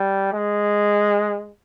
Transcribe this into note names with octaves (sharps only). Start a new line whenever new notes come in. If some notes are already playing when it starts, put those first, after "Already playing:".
Already playing: G3
G#3